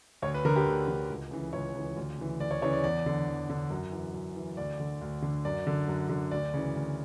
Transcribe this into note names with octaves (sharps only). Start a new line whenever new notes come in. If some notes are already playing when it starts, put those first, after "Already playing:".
D2 C#5
B4
D3 A#4
G4
D2
D3
C#2
C#3 E3
C#2 C#5
C#3 E3
D2
C#3 E3
D2 D5
C#5
C#3 E3 C#5
D5
E2 D5
D3
E2
D3
F#2
E3
F#2
E3
D2 D5
D3
D2
D3
F#2 D5
D3
F#2
D3
D2 D5
C#3 E3
D2